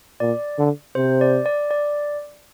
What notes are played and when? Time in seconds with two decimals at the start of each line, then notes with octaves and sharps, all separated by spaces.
0.20 A#2 D5
0.59 D3
0.95 C3 C5
1.21 D5
1.46 D5
1.71 D5